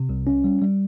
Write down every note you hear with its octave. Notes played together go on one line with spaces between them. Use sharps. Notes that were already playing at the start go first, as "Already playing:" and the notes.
Already playing: C3
C2
C#4
G3
G3